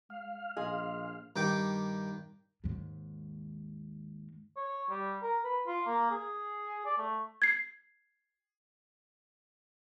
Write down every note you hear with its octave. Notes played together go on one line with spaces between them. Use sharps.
G#3 F5
A#1 G#4 D#5 F5 C6 F6
G2 D#3 G5 D6
D#2 G#2
C#5
G3
A#4
B4
F4
A#3
G#4
D5
A3
G#6 C7